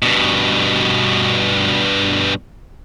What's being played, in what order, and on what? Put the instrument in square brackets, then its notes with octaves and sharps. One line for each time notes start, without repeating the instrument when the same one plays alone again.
[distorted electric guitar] G2 B2